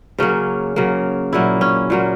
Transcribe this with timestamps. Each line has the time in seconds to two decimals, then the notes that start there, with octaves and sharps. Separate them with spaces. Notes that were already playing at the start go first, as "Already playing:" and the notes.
0.19 C#3 F#3 A#3 C#4
0.76 C#3 F#3 A#3
1.33 A#2 F#3 A#3 E4
1.61 C#4
1.90 A#2 F#3 A#3